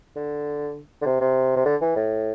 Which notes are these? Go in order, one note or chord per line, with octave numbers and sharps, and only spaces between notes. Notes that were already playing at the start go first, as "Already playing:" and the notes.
D3
D3
C3
C3
C3
D3
E3
A2